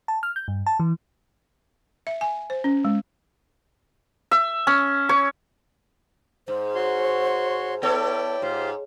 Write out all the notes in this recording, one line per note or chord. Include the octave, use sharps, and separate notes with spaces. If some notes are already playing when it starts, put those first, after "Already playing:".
A5
F6
G6
G2
A5
E3
E5
G#5
C5
C#4
G#3
E5
C#4
C#5
G#2 C5
F#4 C#5 C6
B3 E4 A4 C#5 D5 G5
G#2 F4 G4 C5